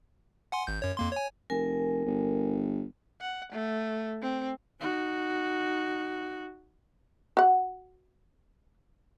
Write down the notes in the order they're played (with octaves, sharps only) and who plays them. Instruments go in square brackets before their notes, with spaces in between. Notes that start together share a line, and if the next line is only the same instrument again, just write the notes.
[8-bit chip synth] F#5 G#5 C6
G#1 G6
F#2 C#5
F2 A#3 C6
C#5 G#5
[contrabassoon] F1 [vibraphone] A#4 G#5
[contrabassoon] G1
[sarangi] F#5
A3
C4
[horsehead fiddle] D#4 F#4
[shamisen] F#4 F#5